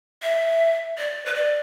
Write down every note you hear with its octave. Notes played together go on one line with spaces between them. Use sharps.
E5
D5
B4
D5